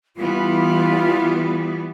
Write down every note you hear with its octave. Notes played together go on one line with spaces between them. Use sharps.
E3 G3 B3 F4